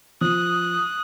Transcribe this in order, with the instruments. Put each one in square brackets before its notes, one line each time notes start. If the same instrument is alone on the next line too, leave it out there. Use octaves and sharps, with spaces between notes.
[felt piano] F3 [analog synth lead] D#6 [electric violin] F#6